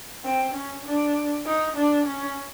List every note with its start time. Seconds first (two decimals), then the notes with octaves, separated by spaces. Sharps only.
0.24 C4
0.54 C#4
0.85 D4
1.47 D#4
1.77 D4
2.07 C#4